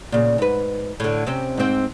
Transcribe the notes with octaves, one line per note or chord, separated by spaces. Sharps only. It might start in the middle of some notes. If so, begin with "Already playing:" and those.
A#2 C#3
G#2 B4
A2 D3
C3 C4 C#4
G#2 C4